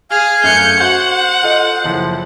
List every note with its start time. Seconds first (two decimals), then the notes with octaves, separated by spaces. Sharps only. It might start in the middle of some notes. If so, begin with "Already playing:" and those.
0.11 G#4 F5 G#5 F6
0.44 F#2 A3 F#6 G6 C#7
0.80 F#4 C5 F#5 G6
1.42 F4 A4 D#5
1.84 F#1 F3 E4